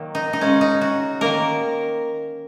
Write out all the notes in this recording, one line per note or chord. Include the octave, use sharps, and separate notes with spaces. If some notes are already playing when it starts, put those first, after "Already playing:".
Already playing: D#3 F#3 A#3
D#4
D#4
C#3 G#3 C#4
D#4
F#4
D#3 A#3 A#4